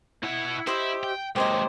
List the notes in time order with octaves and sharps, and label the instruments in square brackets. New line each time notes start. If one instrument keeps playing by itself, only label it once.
[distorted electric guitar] B2 F#5 [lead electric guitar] E4
[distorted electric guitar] E4 [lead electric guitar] G4 [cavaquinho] C5 D#5 E5
[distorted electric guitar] G5
[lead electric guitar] D#2 C3 [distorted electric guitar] G#3 A#3 [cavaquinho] G4 C#5 D#5 [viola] C5